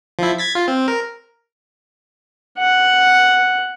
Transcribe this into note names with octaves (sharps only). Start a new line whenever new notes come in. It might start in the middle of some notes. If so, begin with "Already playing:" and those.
F3 E4
G#6 A6 B6
F4
C4
A#4
F#5